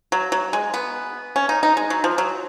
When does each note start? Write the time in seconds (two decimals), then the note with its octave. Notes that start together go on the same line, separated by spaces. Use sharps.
0.12 F#3
0.32 F#3
0.53 G#3
0.74 B3
1.36 C#4
1.49 D#4
1.63 D#4
1.77 G#3
1.90 F#3
2.04 F3
2.18 F#3